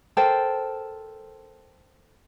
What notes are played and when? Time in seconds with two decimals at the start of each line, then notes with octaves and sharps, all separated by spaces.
0.17 A4 A#4 C5 G5